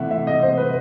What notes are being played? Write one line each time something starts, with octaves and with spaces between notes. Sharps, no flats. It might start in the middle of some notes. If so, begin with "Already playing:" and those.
Already playing: C3 E3 A3 E5 F#5
E5
D#5
C5
B4